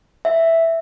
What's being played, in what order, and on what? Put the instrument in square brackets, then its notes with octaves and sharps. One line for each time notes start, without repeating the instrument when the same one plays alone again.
[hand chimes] E5